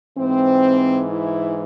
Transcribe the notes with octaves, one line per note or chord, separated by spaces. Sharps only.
G#2 E3 C4
E4